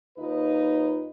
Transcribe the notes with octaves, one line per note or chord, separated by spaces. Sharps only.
D#2 D#4 F4 B4